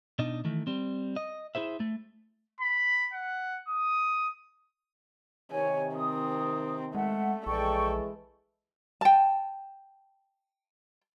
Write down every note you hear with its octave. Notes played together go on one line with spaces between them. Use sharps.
B2 D4 D#4 D#5
D#3 E3 A3
G3 C4
D#5
E4 G#4 C5 E5
A3
B5
F#5
D#6
C3 D#3 C#5 G#5
C4 D#6
G#3 A3 F#5
A#1 E3 G#3 A4 D5 G5 C#6
G5 A5